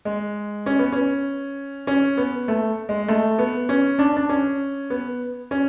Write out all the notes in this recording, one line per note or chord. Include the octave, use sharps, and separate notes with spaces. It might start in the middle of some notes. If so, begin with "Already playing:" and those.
G#3
C#4
B3
C#4
C#4
B3
A3
G#3
A3
B3
C#4
D4
D4
C#4
B3
C#4